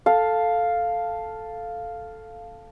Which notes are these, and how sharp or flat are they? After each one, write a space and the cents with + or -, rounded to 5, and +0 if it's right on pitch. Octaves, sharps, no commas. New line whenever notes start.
A4 +0 F5 +0